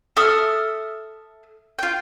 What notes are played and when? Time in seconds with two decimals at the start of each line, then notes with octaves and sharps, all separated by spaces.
0.17 A4 E5 D#6 F6
1.79 F4 G5